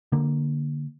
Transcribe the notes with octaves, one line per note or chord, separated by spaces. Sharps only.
D3 A#3